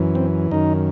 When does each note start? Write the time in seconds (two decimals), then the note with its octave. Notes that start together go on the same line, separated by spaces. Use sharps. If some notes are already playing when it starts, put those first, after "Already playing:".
Already playing: F#2 E3
0.15 C4
0.51 F#2 D#3 D#4